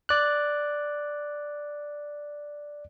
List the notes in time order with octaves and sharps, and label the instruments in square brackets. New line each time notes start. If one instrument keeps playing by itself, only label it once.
[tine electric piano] D5 F#6